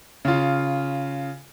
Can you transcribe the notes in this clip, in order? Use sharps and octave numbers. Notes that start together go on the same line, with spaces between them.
C#3 F4